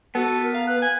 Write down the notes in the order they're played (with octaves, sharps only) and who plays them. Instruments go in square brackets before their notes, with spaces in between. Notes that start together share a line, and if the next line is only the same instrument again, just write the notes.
[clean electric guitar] B3 [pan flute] F#4 [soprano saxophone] A4
[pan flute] A#4
[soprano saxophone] F5 [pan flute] A#5
[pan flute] B4 [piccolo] F#6
[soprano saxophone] G#5